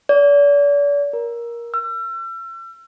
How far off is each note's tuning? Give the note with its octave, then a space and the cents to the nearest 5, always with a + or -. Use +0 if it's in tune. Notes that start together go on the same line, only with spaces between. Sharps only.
D5 -40
A#4 +15
E6 +40